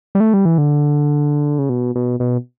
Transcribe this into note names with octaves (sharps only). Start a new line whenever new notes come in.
G3
A3
G3
E3
D3
C#3
B2
B2
B2